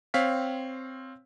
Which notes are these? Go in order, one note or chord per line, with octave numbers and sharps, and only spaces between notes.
C4 C#5 F5 B6